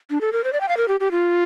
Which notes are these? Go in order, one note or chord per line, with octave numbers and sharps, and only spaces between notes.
D4
A4
A#4
C5
D5
G5
F5
A#4
G4
G4
F4